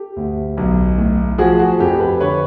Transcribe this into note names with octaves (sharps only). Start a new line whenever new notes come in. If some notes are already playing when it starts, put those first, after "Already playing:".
Already playing: G4 A4
D2
B1
A2
F3 F#4 G#4
F#4 G#4
F2 G4 A4
A4 B4
D3 B4 C#5